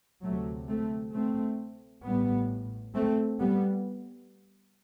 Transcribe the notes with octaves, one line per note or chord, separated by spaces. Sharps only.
D2 C3 F#3 A3
A3 C4
A3 C4
A1 A2 G3 B3
A3 C4
G3 B3